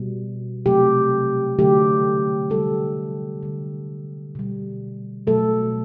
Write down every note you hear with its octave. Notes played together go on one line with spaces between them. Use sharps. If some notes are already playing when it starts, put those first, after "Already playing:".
Already playing: B2 G3
C3 F#3 A3 G4
D3 F#3 A3 G4
D3 G3 A4
D3 G3
B2 G3
B2 F#3 A3 A4